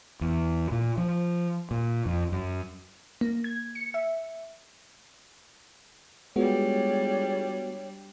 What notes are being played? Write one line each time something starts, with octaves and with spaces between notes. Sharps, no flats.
E2
A#2
F3
A#2
F2
F#2
A#3
G#6
C#7
E5
G3 G#3 B3 D4 F4 F#4 G#4 C#5